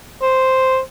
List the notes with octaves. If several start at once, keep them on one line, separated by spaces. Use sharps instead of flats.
C5